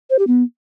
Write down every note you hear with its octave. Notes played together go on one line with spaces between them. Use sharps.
C5
G4
B3